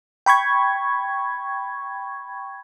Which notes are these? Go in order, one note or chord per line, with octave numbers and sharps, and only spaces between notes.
G5 B5 C#6 G#6